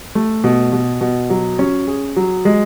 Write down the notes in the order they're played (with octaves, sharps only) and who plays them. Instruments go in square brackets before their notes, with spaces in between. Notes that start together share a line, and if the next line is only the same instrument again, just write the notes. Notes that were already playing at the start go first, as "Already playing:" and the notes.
[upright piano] A3
B2
B2
B2
F#3
C#4
G#4
F#3
G#3